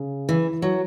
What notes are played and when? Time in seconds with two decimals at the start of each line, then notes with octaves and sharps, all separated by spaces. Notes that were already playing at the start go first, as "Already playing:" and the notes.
Already playing: C#3
0.29 E3
0.62 F#3